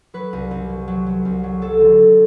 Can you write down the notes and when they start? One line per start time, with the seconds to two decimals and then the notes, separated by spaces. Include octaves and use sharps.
0.14 F#3 B4
0.33 C2
0.51 C2
0.69 F#3
0.88 F#3
1.06 F#3
1.25 C2
1.44 F#3
1.62 F#3 A4
1.80 D3
1.99 D3